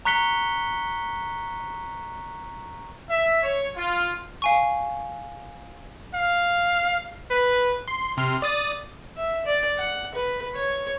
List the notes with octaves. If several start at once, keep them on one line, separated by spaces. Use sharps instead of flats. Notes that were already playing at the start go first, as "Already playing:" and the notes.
A#5 C#6 F#6 B6 C#7 G7
E5
C#5
F4
F5 G#5 C#6
F5
B4
C6
C3 C6 F6
D5 D#6 A6
E5
D5
F#5
B4
C#5